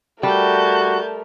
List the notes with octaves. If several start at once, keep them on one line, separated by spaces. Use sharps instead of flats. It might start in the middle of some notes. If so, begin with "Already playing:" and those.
G3 A3 F#4 A#4 A5 G6